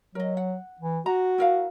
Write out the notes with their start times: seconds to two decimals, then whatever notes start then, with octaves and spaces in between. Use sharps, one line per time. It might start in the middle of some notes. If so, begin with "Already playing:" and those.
0.15 F#3 A#4 D#5
0.37 F#5
0.81 E3
1.06 F#4 A#5
1.38 E4 A#4 F5